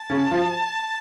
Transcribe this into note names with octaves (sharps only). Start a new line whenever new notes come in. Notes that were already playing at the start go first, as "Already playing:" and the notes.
Already playing: A5
C#3 C#4
F3 F4